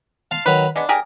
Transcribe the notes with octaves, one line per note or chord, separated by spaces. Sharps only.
F5 A5 C6
D#3 F#3 B4
G#3 B3 D4
G4 G#4 A#4